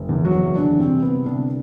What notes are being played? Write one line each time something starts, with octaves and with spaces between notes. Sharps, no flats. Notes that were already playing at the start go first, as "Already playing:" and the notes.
Already playing: F#1
E2
F#3 F#4
F#1
D3 E3 D4
C2 C3 C4
C3 B3
C2 D3 D4